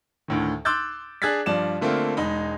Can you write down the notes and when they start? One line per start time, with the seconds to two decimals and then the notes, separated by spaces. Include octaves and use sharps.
0.28 D2 A2 D#3
0.65 C6 D6 E6 F#6 G6 A6
1.22 D4 G#4 F#6 G#6 A6 B6
1.46 G2 F3 D5 E7
1.81 D3 A3 A#3 C4 F4
2.17 E1 G#3 D#4 B5